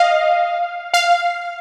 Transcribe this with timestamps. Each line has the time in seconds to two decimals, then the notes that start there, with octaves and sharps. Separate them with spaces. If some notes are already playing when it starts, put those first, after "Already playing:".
Already playing: D#5 F5
0.94 F5